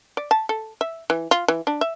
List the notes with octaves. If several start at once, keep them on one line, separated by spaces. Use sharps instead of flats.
D5
A5
A4
E5
E3
F4
E3
D4
E5